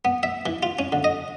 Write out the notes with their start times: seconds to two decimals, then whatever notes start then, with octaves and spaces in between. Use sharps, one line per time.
0.05 B3
0.23 E5
0.46 E3
0.63 F4
0.79 C#4
0.92 D3
1.04 D#5